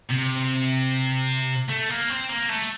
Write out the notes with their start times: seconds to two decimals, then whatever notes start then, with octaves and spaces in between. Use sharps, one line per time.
0.10 C3
1.69 A3
1.89 A#3
2.09 C4
2.29 A#3
2.49 A3